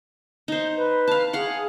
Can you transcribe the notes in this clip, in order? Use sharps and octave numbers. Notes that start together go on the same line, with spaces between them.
D#4 C5
B4
F5 A5
G#4 F5 F#5 C#6